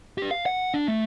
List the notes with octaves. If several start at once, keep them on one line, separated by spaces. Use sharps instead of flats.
D4 G4
F5
F#5
D4
A3